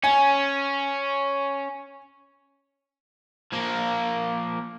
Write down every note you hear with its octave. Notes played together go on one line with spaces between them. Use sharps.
C#4 G#5
F3 A#3